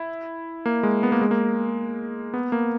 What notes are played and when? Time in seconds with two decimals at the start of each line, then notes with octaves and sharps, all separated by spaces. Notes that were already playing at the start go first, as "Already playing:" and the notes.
Already playing: E4
0.66 A#3
0.83 G#3
1.03 B3
1.12 A#3
1.21 G#3
1.31 A#3
2.34 B3
2.52 A#3